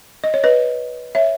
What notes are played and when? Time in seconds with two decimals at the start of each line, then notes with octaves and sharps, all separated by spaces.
0.24 D#5
0.34 C#5
0.44 B4 D#5
1.15 C#5 E5